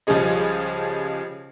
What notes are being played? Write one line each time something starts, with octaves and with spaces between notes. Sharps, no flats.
C#2 F3 G3 C#4 G#4 D#5